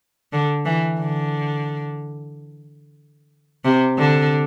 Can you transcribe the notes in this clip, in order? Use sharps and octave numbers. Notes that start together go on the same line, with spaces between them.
D3
E3
D3
C3
D3